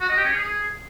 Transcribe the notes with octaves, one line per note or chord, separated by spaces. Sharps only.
F#4
D#5
G4
C#4
G#4